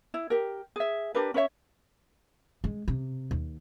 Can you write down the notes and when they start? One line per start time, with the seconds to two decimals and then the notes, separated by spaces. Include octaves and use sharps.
0.14 E4
0.30 G4 A#4
0.76 G#4 E5
1.15 D4 G4 A#4 B4
1.34 C#4 B4 C#5 E5
2.64 G#3
2.88 C3
3.31 D#2